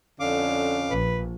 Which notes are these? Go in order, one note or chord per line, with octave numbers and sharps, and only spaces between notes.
F2 D3 C#4 F5 D6
A#1 B4